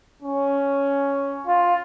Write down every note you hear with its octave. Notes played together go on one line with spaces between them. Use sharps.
C#4
F4